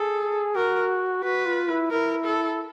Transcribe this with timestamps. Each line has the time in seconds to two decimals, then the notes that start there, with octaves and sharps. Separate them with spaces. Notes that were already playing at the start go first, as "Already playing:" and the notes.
Already playing: G#4 A4
0.55 F#4 A#4
1.23 F#4 B4
1.46 F4
1.69 E4
1.91 E4 A#4
2.25 A4